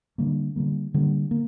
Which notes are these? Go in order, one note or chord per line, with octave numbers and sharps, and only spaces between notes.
D3 G3 A#3
D3 G3 A#3
D3 G3 A#3
A#3